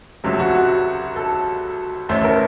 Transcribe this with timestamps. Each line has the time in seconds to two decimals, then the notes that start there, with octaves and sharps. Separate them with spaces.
0.24 C#2 C3 F#3 A3
0.39 F#4
0.55 F#4
1.16 A4
2.09 A1 A2 A3 C#4 C5
2.24 A#4